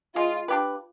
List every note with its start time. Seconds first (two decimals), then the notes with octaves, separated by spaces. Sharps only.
0.16 G#3 F4
0.48 D4 G4 B4